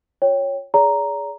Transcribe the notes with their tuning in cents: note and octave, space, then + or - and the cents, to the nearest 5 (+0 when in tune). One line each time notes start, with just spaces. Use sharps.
F4 +20 C#5 +0 G5 +0
G#4 +0 D5 -45 A#5 +0